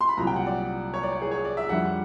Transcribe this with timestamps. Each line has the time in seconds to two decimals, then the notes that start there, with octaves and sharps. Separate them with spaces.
0.01 C6
0.09 B5
0.17 C2 A#2 F#3 A#5
0.27 G5
0.36 F#5
0.46 D5
0.94 C#5
1.03 D5
1.12 C#5
1.22 G#4
1.31 C#5
1.45 D5
1.57 E5
1.69 F2 D3 G3 F#5